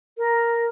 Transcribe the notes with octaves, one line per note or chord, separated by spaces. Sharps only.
A#4